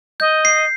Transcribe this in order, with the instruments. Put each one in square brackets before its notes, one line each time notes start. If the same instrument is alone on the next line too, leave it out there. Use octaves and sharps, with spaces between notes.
[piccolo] D#5 [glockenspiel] G6
[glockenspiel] C7